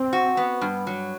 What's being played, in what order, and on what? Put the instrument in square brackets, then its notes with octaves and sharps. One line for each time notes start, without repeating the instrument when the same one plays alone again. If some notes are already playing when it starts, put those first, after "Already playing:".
Already playing: [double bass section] C4
[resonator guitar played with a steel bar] F#4
B3
G2
F#3